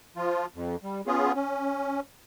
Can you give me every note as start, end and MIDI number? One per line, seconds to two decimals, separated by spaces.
0.16 0.46 53
0.16 0.46 65
0.55 0.76 41
0.83 1.01 55
1.07 1.32 59
1.07 1.32 61
1.07 1.32 65
1.07 1.32 68
1.35 2.00 61